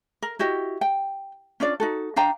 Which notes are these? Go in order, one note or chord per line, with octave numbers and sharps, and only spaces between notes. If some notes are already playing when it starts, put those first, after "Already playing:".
A#4
E4 F#4 G4 D#5
G5
C#4 D4 F4 D5
D#4 F#4 A4
D4 F5 G5 A#5